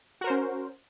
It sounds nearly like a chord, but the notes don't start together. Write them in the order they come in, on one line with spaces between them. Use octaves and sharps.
F#4 A#4 C5 C#4